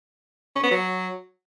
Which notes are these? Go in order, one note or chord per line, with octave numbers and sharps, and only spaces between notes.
C#4
B3
F#3